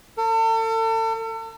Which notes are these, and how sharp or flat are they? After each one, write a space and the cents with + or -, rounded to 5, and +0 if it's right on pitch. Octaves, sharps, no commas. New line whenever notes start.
A4 +40